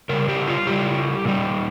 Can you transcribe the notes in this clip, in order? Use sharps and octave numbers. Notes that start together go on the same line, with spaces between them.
C#3 G3 A#4
G4
F4
C#3 G3 G4
A#2 G3